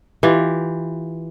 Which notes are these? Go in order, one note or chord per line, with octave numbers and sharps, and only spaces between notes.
E3 F4 G4